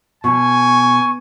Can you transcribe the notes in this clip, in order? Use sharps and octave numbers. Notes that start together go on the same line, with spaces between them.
B2 G#5 C#6